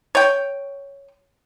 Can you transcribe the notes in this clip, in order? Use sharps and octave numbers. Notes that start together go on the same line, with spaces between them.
C#5 G5